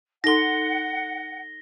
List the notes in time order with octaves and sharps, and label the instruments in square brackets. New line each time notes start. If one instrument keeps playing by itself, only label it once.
[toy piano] D#4 A4 C6 [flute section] F#5 [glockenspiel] A#6 G7